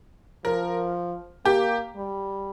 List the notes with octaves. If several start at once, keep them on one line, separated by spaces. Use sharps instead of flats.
F3 A#4
A#3 G4
G3